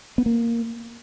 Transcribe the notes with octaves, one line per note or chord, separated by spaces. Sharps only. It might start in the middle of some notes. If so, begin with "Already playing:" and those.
B3
A#3